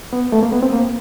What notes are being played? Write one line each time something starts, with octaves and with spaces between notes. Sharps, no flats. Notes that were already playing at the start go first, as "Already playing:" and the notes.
B3
A3
A#3
B3
C4
A#3